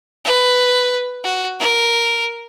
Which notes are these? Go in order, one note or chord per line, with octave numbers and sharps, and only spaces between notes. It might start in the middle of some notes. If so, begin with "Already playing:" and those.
B4
F#4
A#4